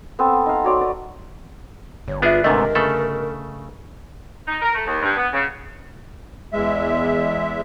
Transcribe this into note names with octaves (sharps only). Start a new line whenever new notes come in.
B3 C4 A4
D#4 F5
F#4 C#5 D5 C6
B4 D5
G1 C#5
B3 D4 F4 G#4 B4 E5
G#2 C3 A3 D4 A#4 D#5
C#3 A3 A4
D#4
A#4
A3
D#2
G2
B3
C#3
E2 G#3 E5